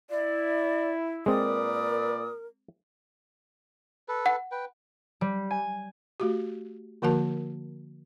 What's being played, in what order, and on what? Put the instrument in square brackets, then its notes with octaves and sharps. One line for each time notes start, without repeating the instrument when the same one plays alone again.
[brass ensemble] E4 [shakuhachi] D5
[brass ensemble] A#2 B4 D5 [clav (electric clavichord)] G#3 C4 [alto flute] A#4 [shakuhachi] D#6
[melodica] A4 B4
[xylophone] F#5
[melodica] B4 G5
[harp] G3
G#5
[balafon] A3 F#4 G4
D3 F3 A#3 F#4 A#4 A5